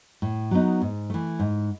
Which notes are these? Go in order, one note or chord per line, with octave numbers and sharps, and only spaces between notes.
A2
F#3 B3 D#4
G#2
E3 A3
G#2